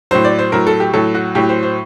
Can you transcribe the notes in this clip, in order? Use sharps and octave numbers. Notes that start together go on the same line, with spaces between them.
A2 F#3 C5
D5
C5
A2 F#3 A#4
A4
G4
A2 F#3 A4
F#4
A2 F#3 G4
C5
C5